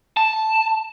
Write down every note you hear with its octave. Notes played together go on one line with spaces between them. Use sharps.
A5